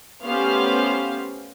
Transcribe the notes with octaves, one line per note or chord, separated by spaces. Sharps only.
A3 B3 C#4 G4 C5 F5